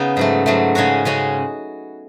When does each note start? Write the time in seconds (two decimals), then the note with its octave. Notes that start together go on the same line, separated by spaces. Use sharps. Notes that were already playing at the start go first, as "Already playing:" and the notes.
Already playing: C#3 B3 D#4
0.17 G#2 F#3 A3
0.46 G#2 F#3 A3
0.75 C#3 G#3 C#4 F#4
1.05 C#3 G#3 C#4 F#4